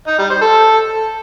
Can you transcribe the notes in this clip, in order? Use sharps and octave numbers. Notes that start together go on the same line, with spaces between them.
D#4
G3
C5
A4